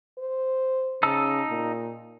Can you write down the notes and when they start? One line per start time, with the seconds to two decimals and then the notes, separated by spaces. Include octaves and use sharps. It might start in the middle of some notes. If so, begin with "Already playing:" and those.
0.19 C5
1.03 C#3 D#4 A5 E6
1.49 A#2